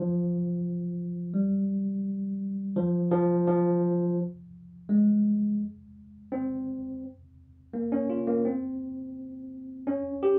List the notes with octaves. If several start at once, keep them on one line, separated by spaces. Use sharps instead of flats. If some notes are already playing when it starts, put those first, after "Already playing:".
Already playing: F3
G3
F3
F3
F3
G#3
C4
A#3
C#4
F4
A#3
C4
C#4
G4